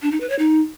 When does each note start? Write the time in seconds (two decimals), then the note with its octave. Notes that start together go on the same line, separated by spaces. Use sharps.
0.02 D4
0.11 D#4
0.20 B4
0.30 C#5
0.39 D#4